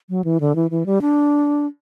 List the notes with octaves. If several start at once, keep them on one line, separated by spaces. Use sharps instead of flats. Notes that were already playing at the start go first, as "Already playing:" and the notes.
F#3
E3
D3
E3
E3
G3
D4